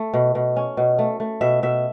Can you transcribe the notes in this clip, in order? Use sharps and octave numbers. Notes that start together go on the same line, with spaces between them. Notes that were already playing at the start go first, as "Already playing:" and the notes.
Already playing: A3
B2
B2
C#4
B2
A3
A3
B2 E5
B2 E5